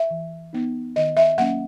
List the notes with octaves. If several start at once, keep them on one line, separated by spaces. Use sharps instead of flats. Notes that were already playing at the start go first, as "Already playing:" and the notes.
Already playing: E5
E3
B3 D#4
D#3 D#5
E5
F#3 A#3 C#4 F#5